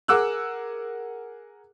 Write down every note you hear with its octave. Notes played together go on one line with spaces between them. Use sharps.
G#4 A#4 F#5 D6 E6 F#6